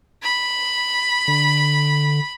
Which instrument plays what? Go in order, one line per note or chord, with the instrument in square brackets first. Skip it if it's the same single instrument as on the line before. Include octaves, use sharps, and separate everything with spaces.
[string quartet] B5
[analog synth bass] D3